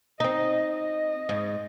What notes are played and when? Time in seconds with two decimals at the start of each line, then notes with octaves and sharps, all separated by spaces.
0.20 C4 D#4 D#5
0.74 D#5
1.29 G#2